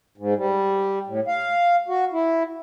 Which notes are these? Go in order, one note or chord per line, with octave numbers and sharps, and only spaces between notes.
G#2
G3
A2
F5
F#4
E4